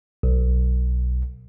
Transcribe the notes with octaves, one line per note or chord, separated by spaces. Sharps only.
B1